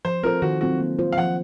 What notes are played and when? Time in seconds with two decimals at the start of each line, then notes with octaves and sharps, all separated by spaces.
0.05 F3 C5
0.23 C4 F4 A4 A#4 C5
0.42 D#3 F#4
0.61 F#3 C4 F4 F#4 A4
0.80 A#3
0.99 F4 C5
1.12 F5
1.18 F3 F#5